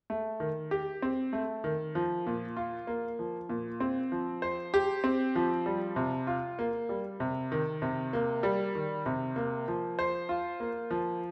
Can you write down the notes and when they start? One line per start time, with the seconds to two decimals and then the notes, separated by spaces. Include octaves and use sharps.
0.10 A3
0.40 D#3
0.71 G4
1.02 C4
1.33 A3
1.64 D#3
1.95 F3
2.27 A#2
2.57 F4
2.87 A#3
3.19 F3
3.49 A#2
3.80 C4
4.12 F3
4.42 C5
4.74 G4
5.04 C4
5.35 F3
5.66 G3
5.96 C3
6.27 F4
6.59 A#3
6.89 G3
7.20 C3
7.52 D#3
7.82 C3
8.13 A#3
8.43 G3
8.75 D#3
9.06 C3
9.36 A#3
9.68 F3
9.99 C5
10.29 F4
10.60 A#3
10.91 F3